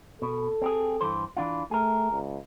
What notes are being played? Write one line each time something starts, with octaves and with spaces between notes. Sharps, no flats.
B2 A4
C4 G4 G#4
G2 E3 C5
E3 D4 F4
A3 G#4 A#4
C#2